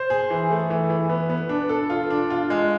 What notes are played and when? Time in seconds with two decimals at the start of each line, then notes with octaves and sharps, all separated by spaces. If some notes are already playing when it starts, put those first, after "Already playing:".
Already playing: C5
0.10 G#4
0.30 E3
0.51 A3
0.70 E3
0.90 E3
1.09 B3
1.29 B3
1.49 D4
1.69 A4
1.90 F4
2.10 D4
2.30 F4
2.50 G#3